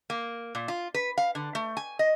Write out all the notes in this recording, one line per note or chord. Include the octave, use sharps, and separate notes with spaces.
A#3
A#2
F4
B4
F5
D3
A3
G#5
D#5